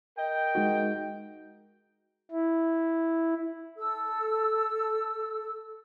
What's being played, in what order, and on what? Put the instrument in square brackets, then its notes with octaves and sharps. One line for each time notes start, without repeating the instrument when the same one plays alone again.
[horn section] A#4 D#5 G5
[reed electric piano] G#3 D#4 F#4
[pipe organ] E4
[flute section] A4 E6